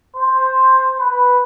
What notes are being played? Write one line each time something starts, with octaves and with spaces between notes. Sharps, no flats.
C5
B4